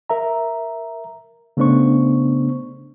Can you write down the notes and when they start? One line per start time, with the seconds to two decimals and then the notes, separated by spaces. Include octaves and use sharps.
0.10 A#4 E5 A#5
1.57 C#3 A3 B3 D4 C5 C#6